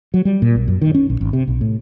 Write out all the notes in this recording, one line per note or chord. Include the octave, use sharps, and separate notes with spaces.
F#3
G3
A#2
B1
F#2
D#3
C#4
A#1
G#1
C3
B1
A2